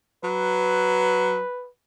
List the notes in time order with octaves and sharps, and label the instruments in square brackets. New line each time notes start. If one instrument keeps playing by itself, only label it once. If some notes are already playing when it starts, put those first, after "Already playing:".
[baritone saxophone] F#3 [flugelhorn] B4